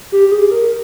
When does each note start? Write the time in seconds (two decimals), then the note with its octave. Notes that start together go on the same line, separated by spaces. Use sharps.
0.12 G4
0.32 G#4
0.52 A#4